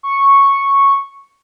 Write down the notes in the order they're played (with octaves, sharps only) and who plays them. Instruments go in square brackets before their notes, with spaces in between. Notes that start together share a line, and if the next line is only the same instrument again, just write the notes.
[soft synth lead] C#6